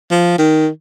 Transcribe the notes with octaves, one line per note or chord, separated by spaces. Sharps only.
F3
D#3